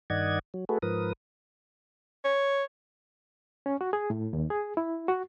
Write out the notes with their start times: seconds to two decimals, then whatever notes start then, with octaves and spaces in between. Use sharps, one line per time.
0.10 G2 D#3 D5 D#5 F#5 G#6
0.54 F#3
0.69 A3 F#4 G#4 A4 B4
0.82 G#2 F3 A#4 B4 D#6
2.25 C#5
3.66 C#4
3.81 F#4
3.93 G#4
4.10 A2
4.33 D#2
4.50 G#4
4.77 E4
5.08 F#4